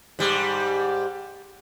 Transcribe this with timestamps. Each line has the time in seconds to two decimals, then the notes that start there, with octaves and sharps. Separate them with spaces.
0.19 G#2 G3